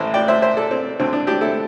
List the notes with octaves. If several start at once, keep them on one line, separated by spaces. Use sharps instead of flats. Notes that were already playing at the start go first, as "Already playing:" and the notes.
Already playing: A1 A2 E3 C5
D5 G5
C5 E5
C5 E5
A4 D5
C4
D2 D3 C4
D4
D4 G4
E4 A4